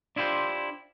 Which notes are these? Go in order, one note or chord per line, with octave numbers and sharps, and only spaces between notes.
D4 E4 F4 G4 C5